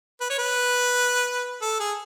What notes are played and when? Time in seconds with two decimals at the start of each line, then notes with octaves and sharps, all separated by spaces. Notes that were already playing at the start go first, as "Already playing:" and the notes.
0.21 B4
0.30 C#5
0.38 B4
1.62 A4
1.80 G#4